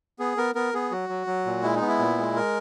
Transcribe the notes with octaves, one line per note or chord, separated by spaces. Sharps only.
B3 G#4
B3 A#4
B3 A#4
B3 G#4
F#3 F#4
F#3
F#3
A#2
G#3 E4
D#4
B3
E4
A#2
G#3
A#4